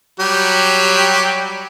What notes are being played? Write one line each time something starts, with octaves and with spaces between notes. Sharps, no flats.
F#3 G3 G4